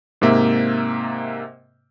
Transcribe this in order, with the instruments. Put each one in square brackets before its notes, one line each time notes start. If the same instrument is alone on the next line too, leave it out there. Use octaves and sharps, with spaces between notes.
[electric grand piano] G#2 C3 A#3 E5